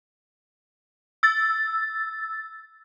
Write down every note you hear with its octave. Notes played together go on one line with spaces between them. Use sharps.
E6 A6